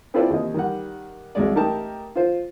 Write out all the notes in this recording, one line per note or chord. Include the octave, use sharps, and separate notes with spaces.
C4 E4 F4 A4 B4 D5
D#2 C3 D#5
D#3 G3 F#5
C2 F#3 G#3 D5
A3 D#4 G4 A#4 G5 A5
F4 C5